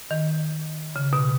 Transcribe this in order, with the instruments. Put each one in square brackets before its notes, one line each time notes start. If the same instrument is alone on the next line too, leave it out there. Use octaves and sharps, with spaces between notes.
[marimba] D#3
C#3
B2